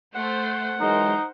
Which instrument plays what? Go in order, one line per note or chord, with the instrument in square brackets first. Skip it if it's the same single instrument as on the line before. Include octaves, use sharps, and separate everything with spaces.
[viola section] A3 C5 [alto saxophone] F#5
[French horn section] E3 F#3 G#3 [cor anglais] D#4 [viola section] A#4 C5